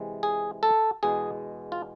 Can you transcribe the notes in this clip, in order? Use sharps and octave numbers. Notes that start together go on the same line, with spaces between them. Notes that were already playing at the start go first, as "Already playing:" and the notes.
Already playing: C3 E3 G#3
G#4
A4
E2 B2 G#3 G#4
F4